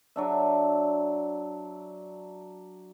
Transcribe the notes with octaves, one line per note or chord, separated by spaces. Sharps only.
F#3 D4 E5